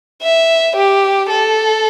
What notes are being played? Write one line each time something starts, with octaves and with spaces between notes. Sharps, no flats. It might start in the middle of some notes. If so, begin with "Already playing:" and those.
E5
G4
A4